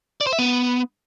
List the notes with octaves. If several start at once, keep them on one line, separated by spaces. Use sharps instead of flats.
D5
C5
E5
B3